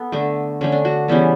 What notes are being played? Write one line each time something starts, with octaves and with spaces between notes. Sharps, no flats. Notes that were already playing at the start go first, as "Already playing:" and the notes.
Already playing: B3 A4
D3 A3
D3 A3 C#4
D4
F#4
C#3 E3 G3 B3